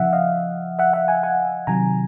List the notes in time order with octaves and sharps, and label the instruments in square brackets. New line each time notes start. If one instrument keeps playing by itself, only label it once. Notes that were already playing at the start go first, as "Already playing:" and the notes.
Already playing: [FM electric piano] C#3 F3 E5 F#5
D#5 F5
E5 F#5
E5 F#5
F#5 G#5
F#5 G#5
C3 D#3 F#3 G#5 A#5